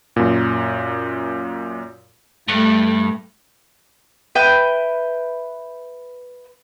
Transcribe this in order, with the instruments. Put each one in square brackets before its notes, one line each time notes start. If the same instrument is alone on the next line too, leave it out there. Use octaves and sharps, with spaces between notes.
[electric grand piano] F#2 A#2
[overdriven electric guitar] G2 [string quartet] A3
[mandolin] B4 E5 G5 G6